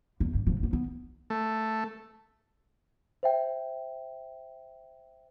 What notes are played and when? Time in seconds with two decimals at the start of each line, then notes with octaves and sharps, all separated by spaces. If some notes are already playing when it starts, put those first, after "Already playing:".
0.20 E2
0.35 G2
0.47 E1 F3
0.60 D#2 B3
0.73 B3
1.30 A3
3.23 C5 E5 G5